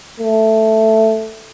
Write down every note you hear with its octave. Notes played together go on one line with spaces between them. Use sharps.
A3